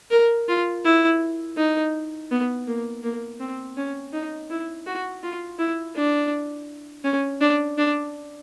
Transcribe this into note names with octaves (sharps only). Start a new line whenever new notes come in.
A#4
F4
E4
D#4
B3
A#3
A#3
C4
C#4
D#4
E4
F#4
F4
E4
D4
C#4
D4
D4